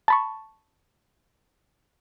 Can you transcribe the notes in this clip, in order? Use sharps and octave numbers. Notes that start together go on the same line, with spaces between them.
A5 B5 C#6